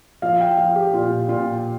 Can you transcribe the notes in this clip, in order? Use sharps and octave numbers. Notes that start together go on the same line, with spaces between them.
F3 F5
G5
F3 F5
G4
A#2 F4
A#2 F4